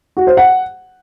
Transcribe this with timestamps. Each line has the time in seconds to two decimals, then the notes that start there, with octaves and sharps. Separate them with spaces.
0.17 F#4
0.27 C5
0.37 F#5